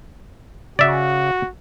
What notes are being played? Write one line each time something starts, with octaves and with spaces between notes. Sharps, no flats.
C#3 F#4 D5 E5